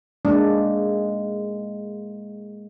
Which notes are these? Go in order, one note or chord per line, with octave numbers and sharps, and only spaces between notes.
G#3 A#3 D4